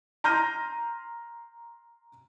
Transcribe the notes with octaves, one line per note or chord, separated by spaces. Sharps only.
A#5 C6 F6 G6 A#6 D#7